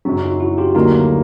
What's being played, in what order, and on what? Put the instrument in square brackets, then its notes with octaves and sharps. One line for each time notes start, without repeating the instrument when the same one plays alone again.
[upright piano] F#2 C#3 F#3 [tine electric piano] C4 D4
[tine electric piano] D#4 F4
E4 F#4
F4 G4
[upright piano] D2 D3 F#3 A#3 [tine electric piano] D#4 F4